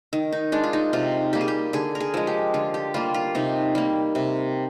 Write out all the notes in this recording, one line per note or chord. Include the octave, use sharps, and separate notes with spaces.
D#3
D#4
G#3 D4
F4
D#4
C3 F4
G3 A#3 G4
G#4
G4
D3 G#4
A#4
G#4
F3 G#3
G4
D3 F4
G4
G3 A#3 F4
F4
C3 D#4
G3 A#3
C3